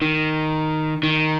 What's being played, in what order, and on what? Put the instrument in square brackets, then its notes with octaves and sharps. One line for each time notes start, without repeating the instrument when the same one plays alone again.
[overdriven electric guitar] D#3
D#3